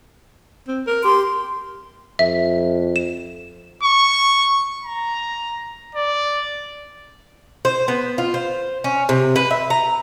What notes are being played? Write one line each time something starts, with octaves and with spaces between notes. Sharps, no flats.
C4
A#4
G4 C6
F2 E5
E7
C#6
A#5
D5
C5
B3
F4
C5
C#4
C3
B4
E5
A#5